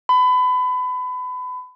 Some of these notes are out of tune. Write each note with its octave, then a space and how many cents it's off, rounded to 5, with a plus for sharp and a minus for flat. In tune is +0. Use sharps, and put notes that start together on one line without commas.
B5 +30